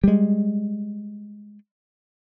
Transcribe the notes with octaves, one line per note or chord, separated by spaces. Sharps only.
G3 G#3